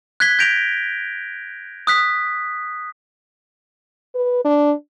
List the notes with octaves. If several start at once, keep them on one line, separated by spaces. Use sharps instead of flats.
F#6 G#6 B6 G7
G6 A#6 D7 F7
D#6 F#6 B6
B4
D4